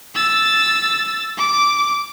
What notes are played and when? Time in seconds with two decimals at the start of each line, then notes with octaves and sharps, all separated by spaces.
0.15 E6 A6
1.37 D6